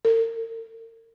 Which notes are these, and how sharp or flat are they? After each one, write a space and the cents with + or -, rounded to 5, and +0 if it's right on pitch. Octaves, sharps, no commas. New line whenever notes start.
A#4 -40